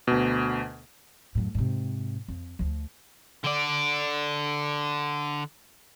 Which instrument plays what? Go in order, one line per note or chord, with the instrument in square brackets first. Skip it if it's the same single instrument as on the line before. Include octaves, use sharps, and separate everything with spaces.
[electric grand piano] D2 B2
[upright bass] F#2 A2
G#2 C3
F2
D2 F3
[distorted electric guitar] D3 D5